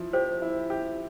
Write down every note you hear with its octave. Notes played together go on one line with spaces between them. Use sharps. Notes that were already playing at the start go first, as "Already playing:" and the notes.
Already playing: F3 E4
G4 C5
E4
G4